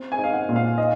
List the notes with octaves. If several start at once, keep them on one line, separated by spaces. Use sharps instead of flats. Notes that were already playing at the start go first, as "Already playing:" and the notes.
Already playing: C4
G#5
D#4
F5
F#5
A#2
F5
D#4 D#5